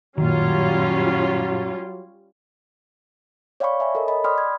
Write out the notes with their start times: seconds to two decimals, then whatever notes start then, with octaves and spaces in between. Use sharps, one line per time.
0.18 F#2 A#2 D#3 F#3 G3 C#4 F4
3.60 C#5 D5 F5 G5 B5 C#6
3.80 E5 G#5 B5
3.95 A4 A#4 C#5 D#5
4.08 D#5 B5
4.24 D5 G5 B5 C6 D#6 F6
4.38 G#6